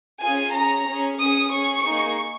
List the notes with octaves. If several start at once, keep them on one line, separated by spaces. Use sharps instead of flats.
C#4 F4 G#4 G#5
C#4 G#4 A#5
C#4 G#4
C#4 G#4 D#6
C#4 G#4 C#6
A#3 D#4 G#4